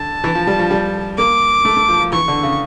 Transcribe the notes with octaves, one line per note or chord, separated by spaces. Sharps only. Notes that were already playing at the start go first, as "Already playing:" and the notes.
Already playing: D3 A5
E3
F3
G3
F3
G3
A#3 D6
A3
A3
F3
F3
E3 C#6
D3
C#3